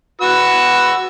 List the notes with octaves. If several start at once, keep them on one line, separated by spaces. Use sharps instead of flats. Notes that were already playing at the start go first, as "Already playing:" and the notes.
F#4 B4 E6